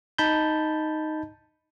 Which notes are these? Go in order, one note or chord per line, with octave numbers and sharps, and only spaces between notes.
D#4 A5 B5 G6